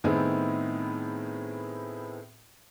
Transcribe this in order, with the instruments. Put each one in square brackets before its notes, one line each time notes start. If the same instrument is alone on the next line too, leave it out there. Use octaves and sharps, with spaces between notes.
[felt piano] A2 D#3 B3 C4 E4 G#4